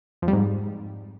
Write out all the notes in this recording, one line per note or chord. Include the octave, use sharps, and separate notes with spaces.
F2
G3
G#2